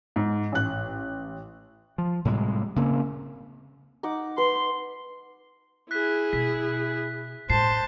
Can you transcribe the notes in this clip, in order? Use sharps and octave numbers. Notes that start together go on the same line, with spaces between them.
G#2
A1 F#6
F3
A2 C3 G3 G#3
C#3 A#3 C4
D#4 F#5 D6
B4 C6
E4 G#4 F#6 B6
B2 B6
A2 C5 A5 C7